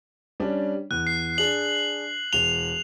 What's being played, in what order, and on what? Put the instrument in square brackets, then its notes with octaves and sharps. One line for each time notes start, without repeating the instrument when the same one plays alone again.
[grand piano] G3 C#4 D4
[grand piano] E2 [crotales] F#6
[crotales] C7
[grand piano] D4 G#4 [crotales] F#7
[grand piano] E1 G7 [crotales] F7